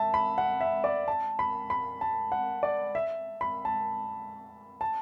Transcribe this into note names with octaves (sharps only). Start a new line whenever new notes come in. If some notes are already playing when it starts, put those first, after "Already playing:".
Already playing: E5 A5
B5
F#5
E5
D5
A5
B5
B5
A5
F#5
D5
E5
B5
A5
A5